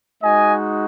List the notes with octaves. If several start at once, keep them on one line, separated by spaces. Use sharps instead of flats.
G#3 D#4 F#4 D#5 G#5